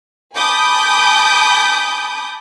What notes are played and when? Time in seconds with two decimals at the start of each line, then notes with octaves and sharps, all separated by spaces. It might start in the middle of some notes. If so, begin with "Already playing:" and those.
0.36 G#5 A5 B5 D6 D#6 G6